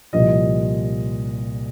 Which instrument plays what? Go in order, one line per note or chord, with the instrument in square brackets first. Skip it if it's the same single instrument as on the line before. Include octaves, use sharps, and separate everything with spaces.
[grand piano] C2 A#2 F3 D#5